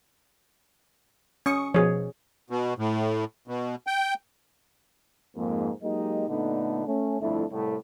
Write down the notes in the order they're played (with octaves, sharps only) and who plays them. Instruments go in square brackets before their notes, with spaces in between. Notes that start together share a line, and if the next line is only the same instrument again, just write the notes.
[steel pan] C#4 [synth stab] C#6 D#6 C#7
[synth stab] B2 F3 [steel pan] G#4 C#5
[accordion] B2
A2
B2
G5
[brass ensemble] F2 G#2 A#3
F#3 G#3 A#3 D#4 G4 D#5
A#2 D3 A3 B3 D4 D#4
A3 C#4
G1 F2 A3 D4 E4
C2 A2